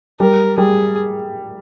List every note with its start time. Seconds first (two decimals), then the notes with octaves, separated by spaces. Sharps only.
0.20 G3 A#4
0.58 G3 G#4